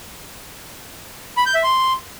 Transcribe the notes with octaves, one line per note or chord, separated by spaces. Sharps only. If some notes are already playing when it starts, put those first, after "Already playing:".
B5
G6
E5
C6